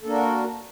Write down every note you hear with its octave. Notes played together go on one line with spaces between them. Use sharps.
A#3 D4 F#4 A4 A#4